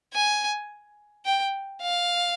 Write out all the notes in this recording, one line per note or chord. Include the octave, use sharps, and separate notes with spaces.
G#5
G5
F5